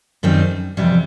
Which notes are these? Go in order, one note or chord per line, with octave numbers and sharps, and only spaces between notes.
F#2 D#3 G3 C4
F2 C3 E3 G3